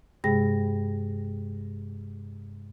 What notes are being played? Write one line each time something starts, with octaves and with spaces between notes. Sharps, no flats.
G2 C3 G#3 G#4 G5 A#6